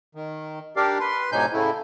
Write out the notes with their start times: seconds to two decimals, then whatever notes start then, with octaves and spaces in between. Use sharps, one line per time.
0.15 D#3
0.76 D4 G4 A#4 D5 F5
1.00 B4 C6
1.32 A2 C3 F#3 D#4 G#5 G6
1.53 A2 C#3 A3 E4